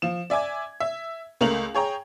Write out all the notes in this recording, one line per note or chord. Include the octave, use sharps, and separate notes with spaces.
F3 E7
D5 E5 G#5 D6 G#6
E5
C#2 A3 A#4 F7 F#7
G#4 C#5 G5 A#5